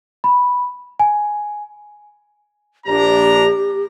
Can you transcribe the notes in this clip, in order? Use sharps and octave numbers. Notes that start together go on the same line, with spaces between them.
B5
G#5
A#1 D4 G4 A#5